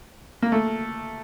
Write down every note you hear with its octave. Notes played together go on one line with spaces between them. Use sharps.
A#3
A3